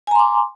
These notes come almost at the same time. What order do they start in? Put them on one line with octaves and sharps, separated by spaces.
G#5 A#5 C6 D6